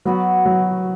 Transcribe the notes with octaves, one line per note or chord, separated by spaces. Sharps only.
F#3 B3 F#4 B4
F#3